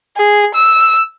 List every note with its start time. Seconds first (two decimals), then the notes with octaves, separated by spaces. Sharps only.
0.16 G#4
0.54 E6